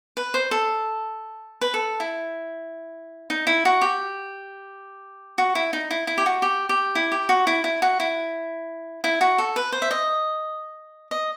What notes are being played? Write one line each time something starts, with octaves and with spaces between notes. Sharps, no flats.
B4
C5
A4
B4
A4
E4
D#4
E4
F#4
G4
F#4
E4
D#4
E4
E4
G4
F#4
G4
G4
E4
G4
F#4
E4
E4
F#4
E4
E4
F#4
A4
B4
C5
E5
D#5
D#5